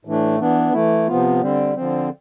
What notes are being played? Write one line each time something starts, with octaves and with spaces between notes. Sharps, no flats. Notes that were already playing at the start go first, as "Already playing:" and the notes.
A2 E3 A3 D4
E3 B3 D4
E3 A3 E4
C3 F3 B3 F4
D3 G3 C4
D3 F3 C4